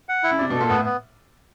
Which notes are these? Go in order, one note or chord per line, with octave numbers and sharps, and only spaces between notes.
F#5
E4
C#3
C3 D5
B2 A4
A#2
A2 B3
B3